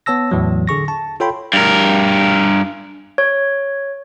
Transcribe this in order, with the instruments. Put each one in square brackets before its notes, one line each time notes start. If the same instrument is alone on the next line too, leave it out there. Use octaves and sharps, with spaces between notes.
[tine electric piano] B3 C#5 A5 E6 A#6
E2 A2 E3 F#3
D3 G#4 C#6 A#6
A5
F4 A4 C#5 G5 B5 C6
[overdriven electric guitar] G2 A#4
[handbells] C#5